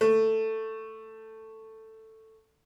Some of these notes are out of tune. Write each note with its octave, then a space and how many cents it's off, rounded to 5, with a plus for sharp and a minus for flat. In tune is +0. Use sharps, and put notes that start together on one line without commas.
A3 +10